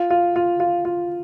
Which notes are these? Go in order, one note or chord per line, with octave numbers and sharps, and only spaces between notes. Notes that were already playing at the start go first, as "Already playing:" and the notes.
Already playing: F4
F4
F4
F4
F4